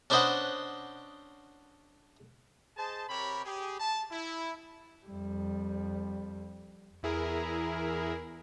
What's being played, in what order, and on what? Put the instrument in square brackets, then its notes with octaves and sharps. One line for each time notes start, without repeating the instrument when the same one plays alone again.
[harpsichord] C#4 D4 B4 C5 D#5 F#5
[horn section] G#4 C5 D#5 A5
C3 G4 A#4 C#5 B5
G4 G#4
A5
E4
[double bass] F2 G3
[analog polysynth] E2 E4 G#4 A#4